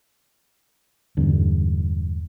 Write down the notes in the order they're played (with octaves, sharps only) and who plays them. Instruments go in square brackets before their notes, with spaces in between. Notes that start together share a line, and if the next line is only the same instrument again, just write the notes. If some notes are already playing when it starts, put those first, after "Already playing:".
[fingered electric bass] E1 E2 G2 D3